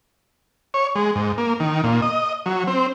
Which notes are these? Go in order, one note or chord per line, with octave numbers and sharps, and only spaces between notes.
C#5
G#3
G#2
A#3
D#3
A#2
D#5
F#3
C4